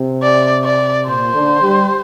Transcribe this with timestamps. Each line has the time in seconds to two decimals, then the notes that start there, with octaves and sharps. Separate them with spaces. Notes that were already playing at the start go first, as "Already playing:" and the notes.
Already playing: C3
0.22 D5
0.64 D5
1.06 A#2 C5
1.34 D3
1.62 G3